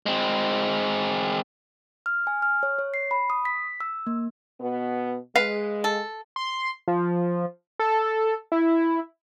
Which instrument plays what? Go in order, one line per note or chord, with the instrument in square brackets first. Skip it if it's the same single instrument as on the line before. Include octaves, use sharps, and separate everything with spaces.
[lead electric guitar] G#3 C4
[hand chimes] F6
G#5
F6
C#5
C#5
C7
B5
D#6
B6
E6
A#3
[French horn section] B2 B3
[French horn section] G#3 [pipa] B4 [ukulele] F5
[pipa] A4
[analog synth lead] C6
F3
A4
E4